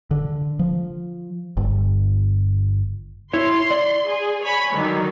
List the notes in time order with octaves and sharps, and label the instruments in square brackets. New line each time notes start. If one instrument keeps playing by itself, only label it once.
[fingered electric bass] D3
F3
G1
[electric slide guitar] E4 C#5 [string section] C6
[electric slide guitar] D5
[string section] G#4
C#5 G#5 B5
D3 D#3 F#3